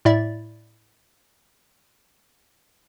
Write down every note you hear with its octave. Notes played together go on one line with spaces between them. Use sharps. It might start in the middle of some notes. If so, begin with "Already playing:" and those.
A2 E4 D5 E5 A6